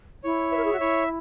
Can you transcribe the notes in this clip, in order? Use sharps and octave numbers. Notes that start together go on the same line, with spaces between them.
E4 C#5
B4 E5
A#4
G#4
F#4
E4 C#5